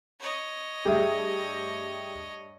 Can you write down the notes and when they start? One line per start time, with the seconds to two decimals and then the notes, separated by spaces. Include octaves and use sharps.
0.20 C#5 D#5
0.85 G2 G3 A3 G4 G#4 E5